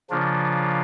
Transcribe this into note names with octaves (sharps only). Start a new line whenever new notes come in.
C#3 F3 A#3 D4 F4